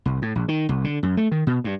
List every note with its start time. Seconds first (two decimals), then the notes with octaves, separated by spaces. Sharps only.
0.05 C2
0.22 A2
0.35 A#1
0.48 D#3
0.69 C2
0.84 D3
1.03 F#2
1.17 A3
1.32 D#3
1.47 B2
1.64 G2